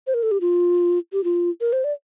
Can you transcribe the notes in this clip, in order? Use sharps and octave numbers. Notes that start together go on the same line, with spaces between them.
C5
A#4
A4
G4
F4
G4
F4
A#4
C5
D5